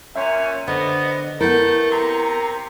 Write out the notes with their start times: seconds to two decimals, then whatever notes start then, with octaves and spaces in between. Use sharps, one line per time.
0.16 A#2 C#4 E5
0.68 D3 B3 C5 D#5
1.40 A3 B3 E4 A#4 G6
1.91 C3 A#5